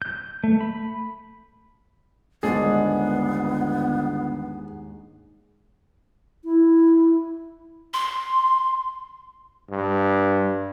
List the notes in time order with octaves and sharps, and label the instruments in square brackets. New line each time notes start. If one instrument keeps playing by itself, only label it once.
[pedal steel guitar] G6
A3
B5
[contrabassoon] G1 [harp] D#2 G#2 D4 [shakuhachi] B3 [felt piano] G#4
[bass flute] E4
[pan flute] C6
[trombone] G2